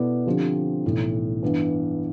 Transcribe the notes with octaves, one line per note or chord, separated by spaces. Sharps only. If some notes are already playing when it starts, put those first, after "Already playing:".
Already playing: B2 B3 E4 A4 D5
D3 F3 C4 G4
B1 A2 E3
G2 E3 B3